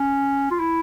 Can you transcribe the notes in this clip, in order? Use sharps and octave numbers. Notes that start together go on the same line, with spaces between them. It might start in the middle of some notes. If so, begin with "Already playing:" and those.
Already playing: C#4
F4
E4